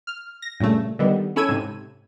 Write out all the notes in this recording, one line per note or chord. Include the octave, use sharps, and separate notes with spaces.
F6
A#6
G2 A#2 C#3 A3
D3 D#3 G3 B3
C#4 E4 A4 E6 G#6 D#7
G#2 C3